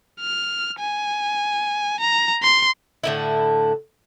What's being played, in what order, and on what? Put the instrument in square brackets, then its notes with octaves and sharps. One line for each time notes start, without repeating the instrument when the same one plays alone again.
[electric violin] F6
G#5
A#5
C6
[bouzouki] A2 D3 E4